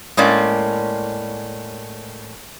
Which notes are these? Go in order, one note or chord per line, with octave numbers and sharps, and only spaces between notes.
A2 G#3 A#3 C#4 D5